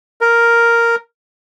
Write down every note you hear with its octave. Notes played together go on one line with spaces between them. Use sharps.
A#4